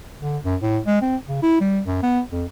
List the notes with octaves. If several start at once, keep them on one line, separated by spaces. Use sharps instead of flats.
D3
F#2
A2
G#3
C4
C#3
E4
G3
F#2
B3
F2